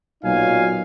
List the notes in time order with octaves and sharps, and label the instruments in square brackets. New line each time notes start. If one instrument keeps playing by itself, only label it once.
[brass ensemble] B1 A#2 F#3 D#4 F5 G#5